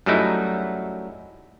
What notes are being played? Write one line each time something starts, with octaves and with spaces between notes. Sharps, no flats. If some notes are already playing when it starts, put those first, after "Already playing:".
F#2 F#3 G3 A3 D#4 E4